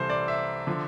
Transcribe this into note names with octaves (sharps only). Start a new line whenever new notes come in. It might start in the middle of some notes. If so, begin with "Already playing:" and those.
Already playing: C2 C3 E3 A4 C5
D5
E5
D3 F3